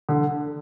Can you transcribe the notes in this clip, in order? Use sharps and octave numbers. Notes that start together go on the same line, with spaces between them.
D3